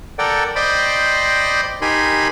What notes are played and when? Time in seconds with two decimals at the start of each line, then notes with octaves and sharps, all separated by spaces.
0.19 A4 A#4 D5 F#5 G5
0.56 C5 D5 D#5 G5 B5 C6
1.82 D#4 G4 A#4 G#5 B5 C6